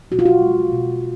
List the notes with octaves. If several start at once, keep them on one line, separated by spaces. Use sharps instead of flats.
B2 F#4
F4
F#4
G#3
B2